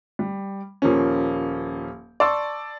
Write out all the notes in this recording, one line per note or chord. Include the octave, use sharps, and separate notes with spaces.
G3
D#1 F3 A#3 C#4
D5 A5 C6 C#6 E6